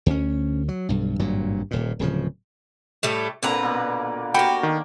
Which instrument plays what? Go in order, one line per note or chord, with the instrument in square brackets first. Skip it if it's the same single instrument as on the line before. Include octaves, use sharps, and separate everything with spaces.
[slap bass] D2 C#4
F#3
B1 G2
G#1 G2 A#2 F#3
D#1 A#2
D1 C#3 F3
[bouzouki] A2 G3 A3
[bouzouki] A#2 B4 A#5 [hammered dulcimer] D3 A#3 C4
[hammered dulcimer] B2 A#3
[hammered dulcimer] A#3 A#4 [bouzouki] F#4 G4 [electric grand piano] G5 B5
[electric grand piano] D#3